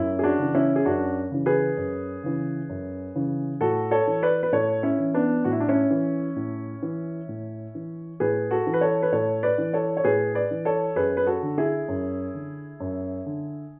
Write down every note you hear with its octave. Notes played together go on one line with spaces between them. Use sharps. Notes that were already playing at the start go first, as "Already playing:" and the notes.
Already playing: F#2 E4
G#4
D4 F#4
C#3 E3
C#4 E4
G#4
F#2 D4 F#4
C#3 E3
G#4 B4
F#2
C#3 E3
F#2
C#3 E3
A2 F#4 A4
A4 C#5
E3
B4 D5
B4
A2 A4 C#5
C#4 E4
E3
B3 D4
A2 F#4
E4
D4
C#4 E4
E3
A2
E3
A2
E3
A2 G#4 B4
F#4 A4
E3
B4
A4 C#5
B4
A2 A4 C#5
B4 D5
E3
A4 C#5
C#5
A2 G#4 B4
B4 D5
E3
A4 C#5
F#2 G#4 B4
B4
F#4 A4
D3
E4 G#4
F#2
D3
F#2
D3